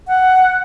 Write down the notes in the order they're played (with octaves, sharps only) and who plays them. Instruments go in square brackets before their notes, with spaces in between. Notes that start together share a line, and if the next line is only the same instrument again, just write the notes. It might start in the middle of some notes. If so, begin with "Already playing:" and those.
[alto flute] F#5